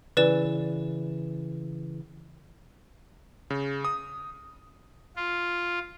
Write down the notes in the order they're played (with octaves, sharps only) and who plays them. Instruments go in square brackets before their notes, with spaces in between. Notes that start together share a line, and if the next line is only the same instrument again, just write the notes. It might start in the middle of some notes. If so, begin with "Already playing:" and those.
[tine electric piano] C#3 E3 [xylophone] B4 D5 E7
[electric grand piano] C#3
D#6
[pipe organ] F4